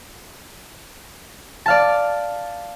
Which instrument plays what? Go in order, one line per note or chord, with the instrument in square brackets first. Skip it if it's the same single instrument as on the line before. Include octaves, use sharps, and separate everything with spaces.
[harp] D5 F5 A5